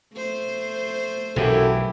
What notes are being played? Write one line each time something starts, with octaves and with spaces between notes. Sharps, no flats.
A3 C5
B1 F#2 A2 E3 E4 G4 A4